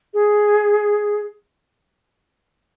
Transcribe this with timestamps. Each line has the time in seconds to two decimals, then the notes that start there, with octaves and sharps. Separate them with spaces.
0.14 G#4